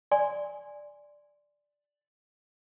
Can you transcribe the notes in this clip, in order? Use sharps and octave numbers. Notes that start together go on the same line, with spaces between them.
D5 G#5 C6